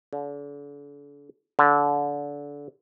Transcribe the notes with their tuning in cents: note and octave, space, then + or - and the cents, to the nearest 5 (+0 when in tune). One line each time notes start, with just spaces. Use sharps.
D3 -40
D3 -25